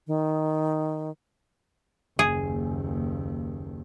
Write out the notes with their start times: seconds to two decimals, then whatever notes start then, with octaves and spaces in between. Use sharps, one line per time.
0.07 D#3
2.19 F#1 D#2 G#4